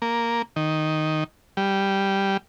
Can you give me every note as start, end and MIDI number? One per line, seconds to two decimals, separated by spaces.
0.02 0.42 58
0.56 1.24 51
1.57 2.37 55